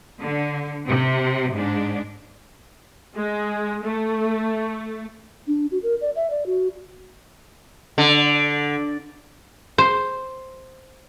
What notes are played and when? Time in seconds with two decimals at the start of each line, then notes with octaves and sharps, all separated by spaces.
0.21 D3
0.87 C3
1.55 G#2 D4
3.15 G#3
3.84 A3
5.47 D4
5.71 F#4
5.83 A#4
6.01 D5
6.16 E5
6.30 D5
6.46 F#4
7.98 D3
9.78 C5